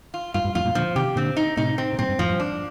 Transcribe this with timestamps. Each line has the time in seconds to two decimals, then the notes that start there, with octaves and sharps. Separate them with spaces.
0.14 F4
0.34 G2 F4
0.44 G2
0.55 F2 A2 F4
0.65 G2 A#2
0.75 A#2 D3 F3
0.96 C3 D#3 G4
1.16 A#2 D3 C4
1.36 D#4
1.57 A2 C3 D#4
1.78 C4
1.93 C3
1.98 G2 A#2 C4
2.09 G2
2.18 F2 A2 F3
2.30 G2
2.40 D4